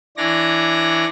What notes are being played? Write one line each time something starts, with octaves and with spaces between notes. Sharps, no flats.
E3 D4 C#5 D5 A#6